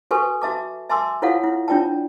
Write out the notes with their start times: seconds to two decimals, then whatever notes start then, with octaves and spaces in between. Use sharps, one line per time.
0.11 F#4 A4 B4 G#5 C#6
0.42 F#4 E5 A5 D6
0.89 E5 G#5 A5 C6 D6 E6
1.22 E4 F4 A4 C#5 F5 F#5
1.44 E4
1.68 D4 F4 D5 G5 A5